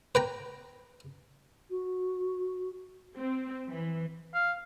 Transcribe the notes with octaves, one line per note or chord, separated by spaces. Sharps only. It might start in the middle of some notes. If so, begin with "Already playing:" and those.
B4 G5 A#5
F#4
C4
E3
F5